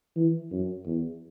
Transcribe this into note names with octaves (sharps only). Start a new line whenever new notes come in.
E3
F#2
E2